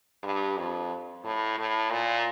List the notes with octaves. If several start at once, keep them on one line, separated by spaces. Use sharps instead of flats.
G2
F2
A2
A2
A#2